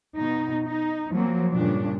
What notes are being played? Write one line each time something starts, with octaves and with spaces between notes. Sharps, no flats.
B2 D#4
D#4
F3 F#3 A#3 C4
G2 A#2 C#3 F3 D4